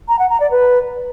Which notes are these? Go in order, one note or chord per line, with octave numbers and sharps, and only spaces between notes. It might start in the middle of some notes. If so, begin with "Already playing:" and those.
A#5
F#5
A#5
D5
B4